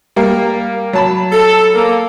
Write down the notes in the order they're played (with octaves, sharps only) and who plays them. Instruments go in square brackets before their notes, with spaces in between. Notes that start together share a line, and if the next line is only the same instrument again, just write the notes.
[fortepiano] G3 A#3
F#3 A5 B5
[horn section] A4
A#3